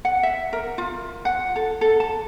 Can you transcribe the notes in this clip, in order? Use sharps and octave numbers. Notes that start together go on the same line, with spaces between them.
F#5
E5
A#4
F4
F#5
A4
A4
A5